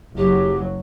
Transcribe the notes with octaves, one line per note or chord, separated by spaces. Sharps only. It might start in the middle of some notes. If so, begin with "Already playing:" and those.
F#1 F#3 G4